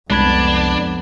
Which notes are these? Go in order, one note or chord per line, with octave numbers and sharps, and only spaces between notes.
C2 F2 G#3 B3 D4 B5 G#6